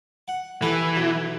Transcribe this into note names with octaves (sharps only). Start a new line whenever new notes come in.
F#5
E3 G4 A4 B4
B1 F#3